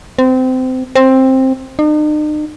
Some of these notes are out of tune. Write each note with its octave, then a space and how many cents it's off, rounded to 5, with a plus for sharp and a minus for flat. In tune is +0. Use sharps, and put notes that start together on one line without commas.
C4 -25
C4 +10
D#4 -45